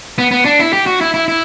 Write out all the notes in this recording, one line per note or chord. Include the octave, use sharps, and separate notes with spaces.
B3
B3
D4
E4
G4
F#4
E4
E4
E4